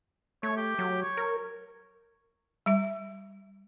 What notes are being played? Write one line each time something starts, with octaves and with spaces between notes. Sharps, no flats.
A3 C#5
G4
F#3
C#5
A#4
G3 E5